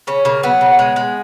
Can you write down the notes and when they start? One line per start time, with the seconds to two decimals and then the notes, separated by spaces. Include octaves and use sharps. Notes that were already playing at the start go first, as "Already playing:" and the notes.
0.07 C#3 C#4
0.25 C#3 A#3
0.43 F#3 B3
0.61 C#3
0.79 G#3
0.96 G#3